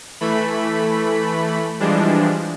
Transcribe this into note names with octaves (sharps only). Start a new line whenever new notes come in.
E3 A3 B5
E3 F3 G3 G#3 D4